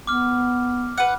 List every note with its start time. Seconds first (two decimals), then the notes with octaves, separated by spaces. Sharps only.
0.07 B3 D6 F6
0.97 B4 F#5